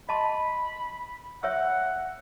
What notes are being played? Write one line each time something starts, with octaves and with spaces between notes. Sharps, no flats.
D#5 A5 B5 C6
C#5 E5 F#5 E6